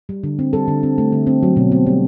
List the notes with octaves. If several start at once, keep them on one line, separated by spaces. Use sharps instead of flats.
G3
D3
C4
G3 A4
D3
C4
A3
D3
C4
F#3
B2
C4
G3